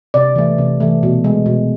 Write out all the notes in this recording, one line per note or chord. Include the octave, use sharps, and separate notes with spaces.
C3 D5
E3 A3
C3
E3 A3
B2
G#3
B2